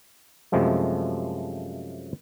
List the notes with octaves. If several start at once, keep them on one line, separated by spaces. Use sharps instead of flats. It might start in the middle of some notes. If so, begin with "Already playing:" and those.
F#2 C3 F3 G#3 A3